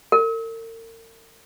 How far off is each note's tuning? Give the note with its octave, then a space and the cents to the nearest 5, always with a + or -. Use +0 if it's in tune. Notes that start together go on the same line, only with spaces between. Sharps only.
A#4 -45